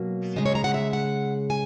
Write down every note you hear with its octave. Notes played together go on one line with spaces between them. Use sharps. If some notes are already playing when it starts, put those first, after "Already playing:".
Already playing: B2 F#3 A#3
C#3 G#3 D#5
C#5
A#5
F#5
E5
F#5
G#5